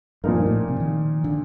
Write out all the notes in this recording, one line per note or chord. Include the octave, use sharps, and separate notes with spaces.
G2 A#2 F3 A#3 D#4 A#4
G2
A2
C3
D#3
D3